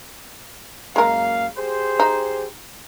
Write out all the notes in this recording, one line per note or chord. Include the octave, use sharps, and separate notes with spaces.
F#2 G#3 A#3 A#4 F5
G4 G#4 C5
D#4